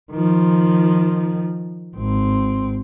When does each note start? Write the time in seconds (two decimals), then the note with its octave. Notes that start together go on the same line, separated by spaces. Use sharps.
0.13 D#3 F3
1.96 G#1 C4